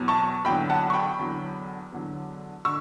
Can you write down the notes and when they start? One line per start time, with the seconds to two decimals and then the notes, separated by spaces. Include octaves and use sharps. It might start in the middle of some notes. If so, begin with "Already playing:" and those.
Already playing: E2 B2 F#3
0.08 A5 C#6
0.45 E2 D3 F#3 G5 B5
0.70 F#5 A5
0.90 C#6
0.94 G5 B5
1.19 E2 D3 F#3
1.92 E2 D3 F#3
2.65 D3 C#6 E6